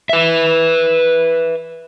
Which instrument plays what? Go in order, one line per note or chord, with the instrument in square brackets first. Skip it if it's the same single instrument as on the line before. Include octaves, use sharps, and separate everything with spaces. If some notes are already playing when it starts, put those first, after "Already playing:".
[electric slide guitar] B4 E5